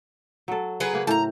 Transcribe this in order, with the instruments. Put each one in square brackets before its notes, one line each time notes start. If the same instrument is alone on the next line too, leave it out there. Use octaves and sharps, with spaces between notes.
[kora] F#3 A4
[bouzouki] F#3 G#4 B4
[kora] C#3 A#3
[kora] A2 [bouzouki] A5 A#5